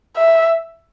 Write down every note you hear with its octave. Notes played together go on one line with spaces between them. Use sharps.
E5